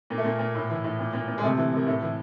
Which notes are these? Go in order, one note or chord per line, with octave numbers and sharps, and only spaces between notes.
A#2 A#3
A3
A#2 A#3
A#2
A2
E3
A2
A#2
A#2
A#2
G#3
C3 A3
E3
C3 A#3
A2 A3
E3